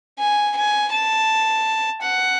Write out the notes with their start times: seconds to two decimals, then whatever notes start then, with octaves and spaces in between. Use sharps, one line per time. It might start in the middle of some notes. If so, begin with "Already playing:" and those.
0.19 G#5
0.57 G#5
0.92 A5
2.02 F#5